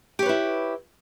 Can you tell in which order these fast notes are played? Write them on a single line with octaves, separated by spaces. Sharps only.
G4 C#5 B4 E4